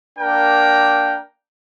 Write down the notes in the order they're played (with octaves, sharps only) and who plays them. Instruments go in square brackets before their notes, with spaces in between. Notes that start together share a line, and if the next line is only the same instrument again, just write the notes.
[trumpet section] A#3 D4 A#4 G5